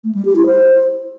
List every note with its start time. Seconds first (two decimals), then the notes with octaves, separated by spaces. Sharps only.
0.04 A3
0.15 G3
0.25 G4
0.36 E4
0.46 C5